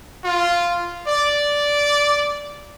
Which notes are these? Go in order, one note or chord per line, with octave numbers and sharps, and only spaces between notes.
F4
D5